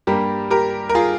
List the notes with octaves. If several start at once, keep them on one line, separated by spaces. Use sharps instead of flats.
G2 G3 A#3 G4 A#4
G4 A#4
A#4
F4 G#4